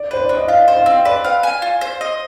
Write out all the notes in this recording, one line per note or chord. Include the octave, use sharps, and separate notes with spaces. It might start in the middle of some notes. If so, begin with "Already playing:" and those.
Already playing: D5
B4 C5
D4 D5
D#5
F4 F5
C5
F5
C4
B4 D5
F5
G#5
F4
C5
D#5